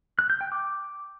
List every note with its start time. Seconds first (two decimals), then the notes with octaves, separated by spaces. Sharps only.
0.19 F#6
0.30 G6
0.41 G5
0.52 D6